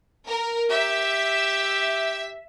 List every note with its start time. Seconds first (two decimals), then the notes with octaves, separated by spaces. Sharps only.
0.27 A#4
0.71 G4 E5